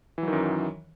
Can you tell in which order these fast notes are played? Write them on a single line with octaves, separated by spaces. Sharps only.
E3 F#3 D#3 F#2